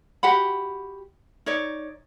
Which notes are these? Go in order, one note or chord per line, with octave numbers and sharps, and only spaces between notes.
F#4 G4 F#5 B5
D#4 C#5 D5